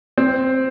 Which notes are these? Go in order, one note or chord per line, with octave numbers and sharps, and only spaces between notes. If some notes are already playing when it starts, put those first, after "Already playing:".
C4